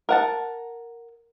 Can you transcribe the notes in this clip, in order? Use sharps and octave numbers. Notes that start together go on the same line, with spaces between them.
A#4 F#5 A5